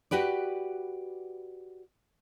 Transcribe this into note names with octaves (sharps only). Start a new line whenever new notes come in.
F#4 G4 B4 D5